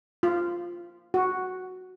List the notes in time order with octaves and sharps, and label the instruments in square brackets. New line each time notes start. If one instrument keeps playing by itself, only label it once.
[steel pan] F4
F#4